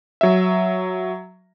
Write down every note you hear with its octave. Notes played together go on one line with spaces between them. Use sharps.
F#3 E5